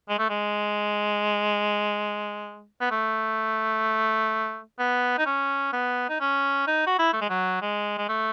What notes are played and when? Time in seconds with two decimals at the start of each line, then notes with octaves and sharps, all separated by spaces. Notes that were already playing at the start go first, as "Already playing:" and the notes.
0.09 G#3
0.19 A3
0.30 G#3
2.81 B3
2.91 A3
4.79 B3
5.19 D#4
5.26 C#4
5.73 B3
6.10 D#4
6.21 C#4
6.67 D#4
6.87 F#4
6.99 E4
7.13 A3
7.22 G#3
7.30 F#3
7.62 G#3
7.98 G#3
8.09 A3